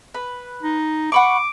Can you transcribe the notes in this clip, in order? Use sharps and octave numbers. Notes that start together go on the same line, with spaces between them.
B4
D#4
F#5 B5 C#6 D6